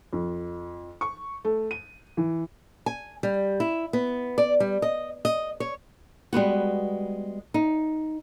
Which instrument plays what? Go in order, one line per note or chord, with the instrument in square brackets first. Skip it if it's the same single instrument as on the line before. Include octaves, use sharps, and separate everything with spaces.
[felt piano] F2
C#6
A3
D#7
E3
[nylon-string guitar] G#5
G3
E4
B3
D5
G3
D#5
D#5
C#5
G3 G#3 B3 F#4
D#4